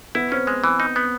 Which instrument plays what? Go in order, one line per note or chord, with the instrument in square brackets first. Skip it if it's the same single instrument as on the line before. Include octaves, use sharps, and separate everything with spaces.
[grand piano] B3 [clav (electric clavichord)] E4
[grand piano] C4 [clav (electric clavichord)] C#4
[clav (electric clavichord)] G#3
E3
D#4
B3